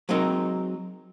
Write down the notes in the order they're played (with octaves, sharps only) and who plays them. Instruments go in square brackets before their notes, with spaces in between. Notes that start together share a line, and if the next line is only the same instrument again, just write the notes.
[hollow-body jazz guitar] F#3 G#3 C4 D#4 A#4